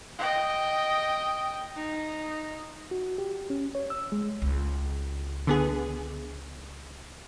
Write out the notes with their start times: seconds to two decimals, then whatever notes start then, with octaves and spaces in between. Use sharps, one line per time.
0.19 D#5 G5
1.76 D#4
2.91 F#4
3.18 G4
3.50 C#4
3.75 C#5
3.90 E6
4.12 G#3
4.42 C#2
5.47 D3 B3 G#4